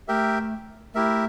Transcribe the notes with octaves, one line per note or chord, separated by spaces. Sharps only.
A3 G4 A#4 E5 G5
A3 E4 G4 A#4 E5